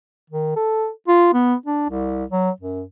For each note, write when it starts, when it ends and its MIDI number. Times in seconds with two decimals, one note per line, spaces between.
0.30 0.51 51
0.56 0.89 69
1.08 1.31 65
1.34 1.55 59
1.66 1.89 62
1.89 2.25 36
2.32 2.50 54
2.60 2.83 42